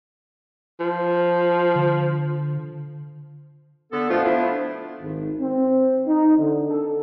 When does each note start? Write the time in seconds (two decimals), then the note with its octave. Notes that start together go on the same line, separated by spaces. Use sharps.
0.80 F3
1.75 D3
3.92 D3 B3 A4
4.09 B2 F3 A3 B3 D4 F4
4.24 F3 A3 B3 D4 E4
5.02 G#1
5.40 C4
6.05 D#4
6.37 D3
6.70 A4